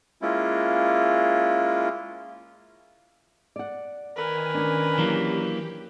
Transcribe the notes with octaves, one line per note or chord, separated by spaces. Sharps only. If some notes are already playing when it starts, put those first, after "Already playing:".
G#3 A#3 C#4 E4 F4
D5 F#5
D#3 A#4 B4 G#5
C#4 D4
E3 F#3 A#3 G4